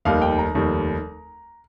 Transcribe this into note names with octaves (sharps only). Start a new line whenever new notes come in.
F1 D#2 D#3 G3 F5
G5
A#5
F1 D#2 D#3 G3